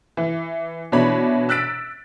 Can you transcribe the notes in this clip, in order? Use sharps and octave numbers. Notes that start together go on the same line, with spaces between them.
E3
B2 E3 D4 C#5 B5
E6 F#6 A6 B6 D7